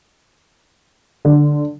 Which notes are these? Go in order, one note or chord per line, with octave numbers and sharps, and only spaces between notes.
D3